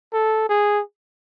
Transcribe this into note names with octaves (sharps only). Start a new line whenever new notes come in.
A4
G#4